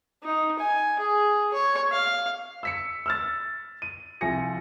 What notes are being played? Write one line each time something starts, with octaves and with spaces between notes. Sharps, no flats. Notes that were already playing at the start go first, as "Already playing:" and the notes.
D#4
G#5
G#4
C#5
F5
E6 B6 C#7
E6 F6 A6
D#7
C2 F3 G#5 A#6 C#7